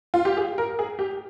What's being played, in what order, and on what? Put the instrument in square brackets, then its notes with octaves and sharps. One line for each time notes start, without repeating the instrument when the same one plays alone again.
[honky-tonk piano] F4
G4
G#4
A#4
G#4
G4